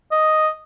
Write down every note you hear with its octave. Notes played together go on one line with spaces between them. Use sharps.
D#5